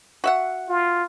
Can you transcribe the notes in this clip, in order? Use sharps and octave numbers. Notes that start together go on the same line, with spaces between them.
F#4 E5 F#5
F4